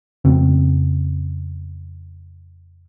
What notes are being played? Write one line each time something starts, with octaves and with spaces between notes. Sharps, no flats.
F2 C#3 C4